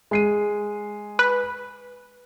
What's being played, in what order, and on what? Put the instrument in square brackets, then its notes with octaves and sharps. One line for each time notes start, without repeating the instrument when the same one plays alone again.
[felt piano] G#3 C7 D#7
[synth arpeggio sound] B4